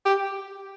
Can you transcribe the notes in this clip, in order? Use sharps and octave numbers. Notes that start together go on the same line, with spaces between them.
G4